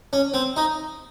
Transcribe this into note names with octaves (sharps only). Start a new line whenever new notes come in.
C#4
C4
D#4